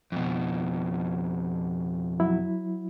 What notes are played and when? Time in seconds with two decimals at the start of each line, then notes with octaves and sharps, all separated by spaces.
0.12 F2 B2
2.20 F#3 E4